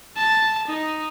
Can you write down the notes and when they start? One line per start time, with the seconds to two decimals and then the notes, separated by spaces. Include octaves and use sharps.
0.16 A5
0.67 D#4